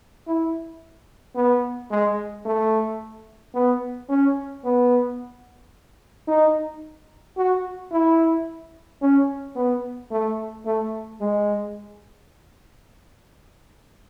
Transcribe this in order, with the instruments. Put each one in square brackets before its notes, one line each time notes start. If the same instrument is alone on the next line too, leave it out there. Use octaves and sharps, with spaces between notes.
[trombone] E4
B3
G#3
A3
B3
C#4
B3
D#4
F#4
E4
C#4
B3
A3
A3
G#3